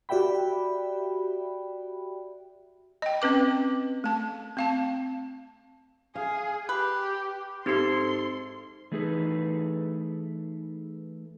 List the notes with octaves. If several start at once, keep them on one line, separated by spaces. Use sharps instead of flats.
F#4 G4 D5 E5 G5 B5
D#5 G5
C4 C#4 B4 D6
A3 A5
C4 F5 A5
G#4 F5
G4 B4
G#2 C4 G4 A4 C6 C7
E3 A3 D#4 G#4 A4 B4